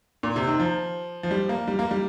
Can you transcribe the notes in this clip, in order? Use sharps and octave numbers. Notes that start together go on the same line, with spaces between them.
A#2
C3
D#3
F3
F3
G3
A#3
G3
A#3
G3